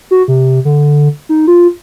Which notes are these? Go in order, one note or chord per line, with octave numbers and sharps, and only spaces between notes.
F#4
C3
D3
D#4
F4